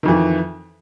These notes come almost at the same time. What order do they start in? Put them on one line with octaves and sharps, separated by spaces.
D#3 F2 E3